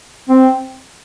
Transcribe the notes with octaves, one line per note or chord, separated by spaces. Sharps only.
C4